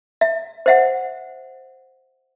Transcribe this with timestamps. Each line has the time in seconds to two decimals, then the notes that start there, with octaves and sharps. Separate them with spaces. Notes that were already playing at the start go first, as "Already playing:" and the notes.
0.21 E5
0.66 C5 E5 F#5